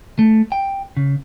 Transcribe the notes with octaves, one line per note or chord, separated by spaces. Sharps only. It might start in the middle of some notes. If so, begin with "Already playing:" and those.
A3
G5
C#3